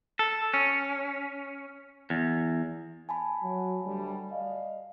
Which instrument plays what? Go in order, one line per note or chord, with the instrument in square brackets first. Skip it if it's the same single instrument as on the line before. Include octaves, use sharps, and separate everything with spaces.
[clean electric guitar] A4
C#4
E2
[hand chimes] G#5 A5 B5
[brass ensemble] F#3
D2 G3
D5 D#5 F5